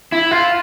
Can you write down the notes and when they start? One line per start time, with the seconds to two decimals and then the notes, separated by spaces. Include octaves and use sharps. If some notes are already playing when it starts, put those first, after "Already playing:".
0.12 E4
0.31 F4